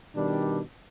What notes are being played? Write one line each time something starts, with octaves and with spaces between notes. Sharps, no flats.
B2 D#3 G3 D4